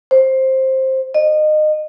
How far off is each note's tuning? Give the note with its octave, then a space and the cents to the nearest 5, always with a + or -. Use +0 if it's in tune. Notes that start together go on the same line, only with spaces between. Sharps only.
C5 +10
D#5 -25